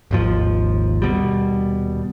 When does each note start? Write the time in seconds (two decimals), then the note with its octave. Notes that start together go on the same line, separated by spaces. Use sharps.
0.11 G#1 D#2 F3
1.02 D#1 B2 G3